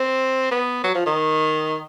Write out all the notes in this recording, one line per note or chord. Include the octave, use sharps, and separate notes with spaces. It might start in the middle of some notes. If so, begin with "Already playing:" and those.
Already playing: C4
B3
F#3
F3
D#3